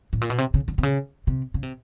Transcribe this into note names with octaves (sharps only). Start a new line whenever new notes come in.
A2
A#2
B2
C3
C#3
D3
C3
C#3
C3
C#3
C3